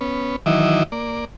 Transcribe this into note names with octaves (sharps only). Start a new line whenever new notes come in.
B3 C#4
D#3 E3 F#3 E4 D#5 D6
A#3 D5